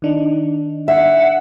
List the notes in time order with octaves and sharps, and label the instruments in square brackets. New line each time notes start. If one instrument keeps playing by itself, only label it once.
[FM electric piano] D#3 D4 D#4
[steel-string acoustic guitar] E5 [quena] F#5